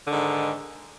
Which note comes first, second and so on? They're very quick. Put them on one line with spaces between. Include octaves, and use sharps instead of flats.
D3 D#3 G#2